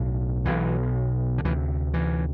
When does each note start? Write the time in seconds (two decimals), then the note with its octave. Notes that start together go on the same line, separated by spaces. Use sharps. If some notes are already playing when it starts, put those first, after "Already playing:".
Already playing: B1 A2
0.45 B1 B2 E3
1.38 D3
1.44 D2 C3 E3
1.94 E3